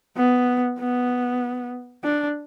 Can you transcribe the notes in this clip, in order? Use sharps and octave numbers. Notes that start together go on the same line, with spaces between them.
B3
B3
D4